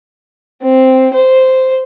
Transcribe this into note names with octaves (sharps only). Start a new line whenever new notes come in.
C4
C5